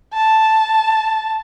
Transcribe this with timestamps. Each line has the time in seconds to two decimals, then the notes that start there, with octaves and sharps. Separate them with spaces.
0.14 A5